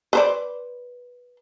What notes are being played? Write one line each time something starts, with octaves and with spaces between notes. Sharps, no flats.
B4 C5 D5